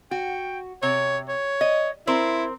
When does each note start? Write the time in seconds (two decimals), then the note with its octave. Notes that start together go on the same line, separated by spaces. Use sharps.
0.11 F#4 G5
0.83 C3 C#5
1.29 C#5
1.61 D#5
2.07 C4 E4 A#4 C5